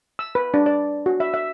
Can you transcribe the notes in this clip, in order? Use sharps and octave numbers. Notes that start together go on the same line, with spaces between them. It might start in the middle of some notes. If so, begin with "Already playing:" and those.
E6
B4
D4
D5
F#4
E5
E5